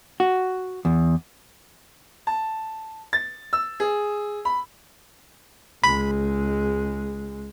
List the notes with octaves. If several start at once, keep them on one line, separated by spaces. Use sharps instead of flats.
F#4
E2
A5
A6
E6
G#4
B5
C#2 G#3 B5